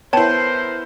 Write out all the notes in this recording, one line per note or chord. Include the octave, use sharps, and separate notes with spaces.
B3 E4 A#4 C5 C#5 G5 A5